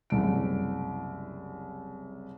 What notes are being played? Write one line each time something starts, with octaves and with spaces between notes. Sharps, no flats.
F#1 C2 D7